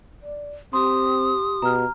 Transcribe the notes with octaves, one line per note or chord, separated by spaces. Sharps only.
D5
C4 G4 C6 D#6
B2 A#5 F6